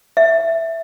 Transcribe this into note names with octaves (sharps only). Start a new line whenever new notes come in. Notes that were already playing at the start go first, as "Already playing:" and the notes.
E5